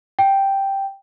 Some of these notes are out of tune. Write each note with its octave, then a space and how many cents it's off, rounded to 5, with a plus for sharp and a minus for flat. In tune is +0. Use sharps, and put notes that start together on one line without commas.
G5 +0